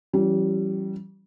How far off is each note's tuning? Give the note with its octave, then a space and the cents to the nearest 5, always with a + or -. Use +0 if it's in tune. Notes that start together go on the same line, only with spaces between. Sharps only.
E3 +25 G3 -25 C#4 +0